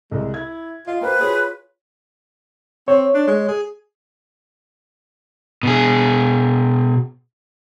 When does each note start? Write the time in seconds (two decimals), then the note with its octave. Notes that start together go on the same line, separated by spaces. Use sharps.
0.12 C2 G#3
0.34 E4 G#6
0.87 F4 D#5
1.01 A#3 F#4 B4 C5 G5
1.20 F4 G#4 C#5
2.88 C4 C#5
3.14 D4
3.27 G#3
3.48 G#4
5.63 B2 G#4